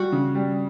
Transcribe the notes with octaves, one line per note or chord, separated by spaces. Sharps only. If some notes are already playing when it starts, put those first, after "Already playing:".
Already playing: G3 F#4
C#3
G3